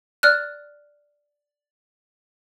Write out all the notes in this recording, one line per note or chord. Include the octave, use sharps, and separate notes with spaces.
D5 F6 F#6